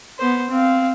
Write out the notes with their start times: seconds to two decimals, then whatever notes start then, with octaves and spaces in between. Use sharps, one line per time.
0.19 B3 C5
0.50 C4 F5